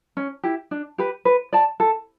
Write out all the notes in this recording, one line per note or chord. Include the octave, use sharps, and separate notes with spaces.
C#4
E4 G4
D4
G4 B4
B4
D5 A5
A4